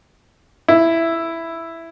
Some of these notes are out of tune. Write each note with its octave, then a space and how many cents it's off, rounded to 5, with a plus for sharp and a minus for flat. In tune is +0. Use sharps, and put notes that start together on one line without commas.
E4 +5